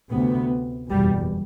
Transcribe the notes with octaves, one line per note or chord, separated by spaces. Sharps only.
D2 C3 B3
F#1 E2 B2 G3